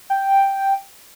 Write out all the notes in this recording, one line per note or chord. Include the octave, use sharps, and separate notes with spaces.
G5